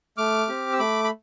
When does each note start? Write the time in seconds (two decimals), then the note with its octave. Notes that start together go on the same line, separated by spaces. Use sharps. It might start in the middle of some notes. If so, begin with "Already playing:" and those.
0.17 A3 D6 F6
0.49 C4 G4
0.73 E6
0.79 A3 B5 D6
1.04 B5